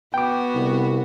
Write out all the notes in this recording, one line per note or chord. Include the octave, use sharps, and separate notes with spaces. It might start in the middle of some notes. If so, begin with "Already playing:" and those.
B3 F#4 G5 D6
C2